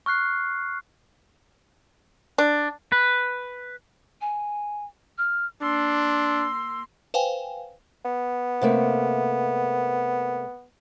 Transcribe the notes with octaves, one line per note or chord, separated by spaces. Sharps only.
C#6 F6 F#6 C7
D4
B4
G#5
F6
A#3 D4 C6 E6
B4 C5 F5 G5 G#5
B3
C3 A3 A#3